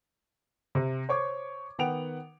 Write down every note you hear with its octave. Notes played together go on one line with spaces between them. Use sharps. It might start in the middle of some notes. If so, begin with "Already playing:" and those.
C3
C5 C#5 C#6 D6 G#6
D#3 B3 F#5 G5 D7 F7